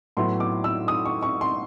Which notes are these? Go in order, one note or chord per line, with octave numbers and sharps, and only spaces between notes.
A2 F#3 B3 E4 C6
D6
E6
D#6
C#6
C#6
C6